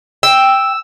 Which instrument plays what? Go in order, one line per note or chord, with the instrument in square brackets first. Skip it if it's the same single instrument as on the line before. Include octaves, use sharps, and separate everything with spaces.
[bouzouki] G5 [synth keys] E6